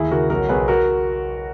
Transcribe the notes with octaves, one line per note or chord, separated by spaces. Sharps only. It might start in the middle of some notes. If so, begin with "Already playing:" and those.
Already playing: D#2 E4 G#4
C#3 F#4 A#4
B1 F#4 A#4
B1 G#4 B4
F#4 A#4